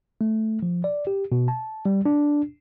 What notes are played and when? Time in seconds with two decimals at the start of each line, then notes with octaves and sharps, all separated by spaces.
0.21 A3
0.63 F3
0.84 D5
1.07 G4
1.32 B2
1.48 A5
1.86 G3
2.06 D4